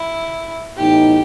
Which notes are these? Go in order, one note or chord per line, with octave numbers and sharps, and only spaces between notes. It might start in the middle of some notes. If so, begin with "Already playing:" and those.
Already playing: E4
A2 E3 B3 D#4 G4